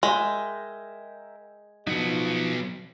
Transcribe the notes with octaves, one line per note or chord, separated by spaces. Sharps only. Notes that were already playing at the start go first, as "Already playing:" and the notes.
G#3 A#4 E5 G5
F3 F#3 B3 D#4